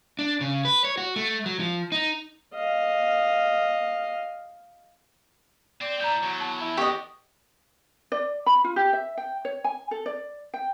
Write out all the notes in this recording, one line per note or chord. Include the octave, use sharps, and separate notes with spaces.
D4
C#3
B4
C#5
F#4
A3
F#3
F3
D#4
D#5 F5
C4 D5
A2 A#5 G6
E2 F#3
A5
E4
B3 G4 D#5 G5 C#6
D5
B5
F4
G4
E5
G5
C#5
G#5
A4
D5
G5